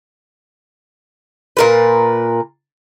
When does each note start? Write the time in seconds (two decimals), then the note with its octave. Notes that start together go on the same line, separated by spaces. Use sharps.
1.57 A#2 A#4 B4